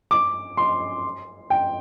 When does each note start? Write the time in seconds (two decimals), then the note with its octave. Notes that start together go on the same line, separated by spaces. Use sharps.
0.11 D6
0.57 C6
1.50 G5